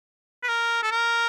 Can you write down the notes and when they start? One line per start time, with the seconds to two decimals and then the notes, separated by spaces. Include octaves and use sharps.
0.43 B4
0.49 A#4
0.83 A4
0.91 A#4